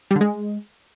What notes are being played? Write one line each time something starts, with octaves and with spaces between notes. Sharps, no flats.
G3
D3
G#3